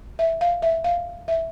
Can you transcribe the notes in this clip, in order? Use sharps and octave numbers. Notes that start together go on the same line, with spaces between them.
E5
F5
E5
F5
E5